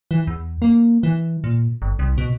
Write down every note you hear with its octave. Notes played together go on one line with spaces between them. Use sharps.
E3
E2
A#3
E3
A#2
G1
C2
B2